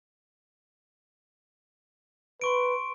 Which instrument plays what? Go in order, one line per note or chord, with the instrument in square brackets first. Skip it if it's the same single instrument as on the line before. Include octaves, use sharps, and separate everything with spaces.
[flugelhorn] B4 [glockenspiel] C6 C#6 D7